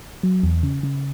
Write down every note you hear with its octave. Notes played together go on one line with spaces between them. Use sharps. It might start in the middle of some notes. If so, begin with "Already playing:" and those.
F#3
E2
C#3
C#3